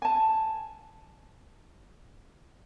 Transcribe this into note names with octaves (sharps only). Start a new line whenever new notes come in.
G#5 A5